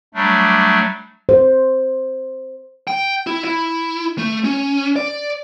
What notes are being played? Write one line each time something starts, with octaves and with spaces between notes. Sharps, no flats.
F#3 G3 A3 D4
C5
G5
E4
E4
A3
C#4
D5